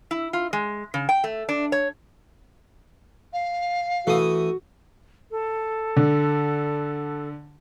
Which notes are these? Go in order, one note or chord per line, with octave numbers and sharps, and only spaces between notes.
E4
F4
G#3
C#3
G5
A3
D4
C#5
F5
E3 A3 F#4 D#6
A4
D3